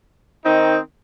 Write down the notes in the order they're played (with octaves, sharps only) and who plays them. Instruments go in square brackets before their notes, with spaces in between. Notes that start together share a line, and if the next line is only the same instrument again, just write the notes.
[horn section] D#3 C4 D#4